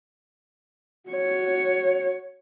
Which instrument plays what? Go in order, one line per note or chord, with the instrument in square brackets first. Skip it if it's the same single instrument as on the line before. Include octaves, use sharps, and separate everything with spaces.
[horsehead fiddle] F#4 C#5